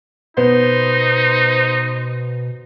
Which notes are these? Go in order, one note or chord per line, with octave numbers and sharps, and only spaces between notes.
B2 B3 D#4 C5